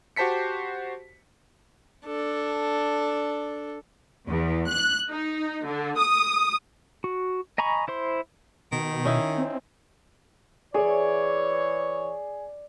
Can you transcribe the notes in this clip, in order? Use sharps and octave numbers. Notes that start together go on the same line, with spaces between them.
F#4 G4 C5 A5 B6 C#7
D4 A4
E2
F#6
D#4
D3
D#6
F#4
D#5 G#5 A#5 B5 C#6
E4 C5 C6
B2 D#3
C#4 D#4 E4
C4
E3 G#4 C#5 D5